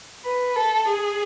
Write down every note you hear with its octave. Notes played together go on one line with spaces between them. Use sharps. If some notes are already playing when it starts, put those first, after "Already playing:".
B4
A4
G#4